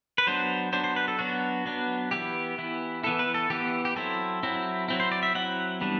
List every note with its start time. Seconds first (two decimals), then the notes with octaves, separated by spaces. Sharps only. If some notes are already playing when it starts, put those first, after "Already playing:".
0.18 B4
0.27 F#3 B3 D4 C5
0.72 F#3 B3 D4 C5
0.84 C5
0.96 B4
1.08 A4
1.19 F#3 B3 D4 F#4
1.66 F#3 B3 D4
2.11 E3 B3 E4 G4
2.58 E3 B3 E4
3.03 E3 B3 E4 A4
3.19 B4
3.34 A4
3.50 E3 B3 E4 G4
3.85 G4
3.96 F#3 C4 E4 A4
4.43 F#3 C4 E4
4.88 F#3 C4 E4
5.00 C5
5.12 D5
5.23 E5
5.35 F#3 C4 E4 F#5
5.81 E3 G3 B3 D4